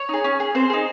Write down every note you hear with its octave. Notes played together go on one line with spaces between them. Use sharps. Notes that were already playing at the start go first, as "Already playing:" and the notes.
Already playing: C#5
D#4 G#4
C#4
G#4
C4 C5
D#4 G#4